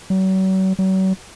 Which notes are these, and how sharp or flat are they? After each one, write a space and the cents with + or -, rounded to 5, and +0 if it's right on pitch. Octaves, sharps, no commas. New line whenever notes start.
F#3 +40
F#3 +40